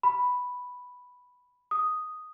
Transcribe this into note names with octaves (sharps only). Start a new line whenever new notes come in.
B5
D#6